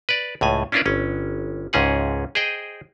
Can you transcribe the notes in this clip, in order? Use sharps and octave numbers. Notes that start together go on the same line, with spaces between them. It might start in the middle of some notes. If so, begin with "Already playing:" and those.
B4 D5
C#2 A2 G#5
C#4 D4 E4 F4 A#4 B4
G1 C#4
C#2 G#2 C#4 G#4 F#5
G#4 C5 D#5 G5